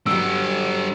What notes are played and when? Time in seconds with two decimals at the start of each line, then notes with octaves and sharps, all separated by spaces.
0.07 G2 D3 F#3 G3 E6